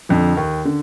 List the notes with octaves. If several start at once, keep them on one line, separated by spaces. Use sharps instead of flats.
F2 D3 F3
D#2
D3